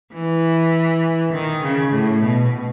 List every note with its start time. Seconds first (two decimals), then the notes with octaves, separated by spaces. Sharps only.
0.13 E3
1.33 D#3
1.63 C#3
1.92 A2
2.23 B2